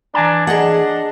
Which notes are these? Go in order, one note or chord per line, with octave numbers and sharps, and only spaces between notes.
E3 D4 G#5 A#5
D4 G#4 D#5 F#5